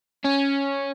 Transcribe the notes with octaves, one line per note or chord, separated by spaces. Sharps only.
C#4